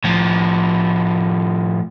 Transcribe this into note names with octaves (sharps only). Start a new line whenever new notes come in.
A2 F3